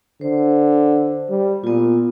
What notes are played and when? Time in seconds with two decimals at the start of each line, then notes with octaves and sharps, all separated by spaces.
0.21 D3 C5
1.30 G3
1.64 A#2 B3 F4